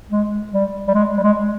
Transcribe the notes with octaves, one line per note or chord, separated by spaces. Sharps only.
G#3
G3
G3
G#3
G3
G#3